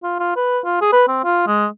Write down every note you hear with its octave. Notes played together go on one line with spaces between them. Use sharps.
F4
F4
B4
F4
G#4
B4
C4
F4
G#3